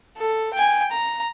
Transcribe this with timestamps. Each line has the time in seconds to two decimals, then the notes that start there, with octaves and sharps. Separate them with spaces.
0.17 A4
0.53 G5 G#5
0.91 A#5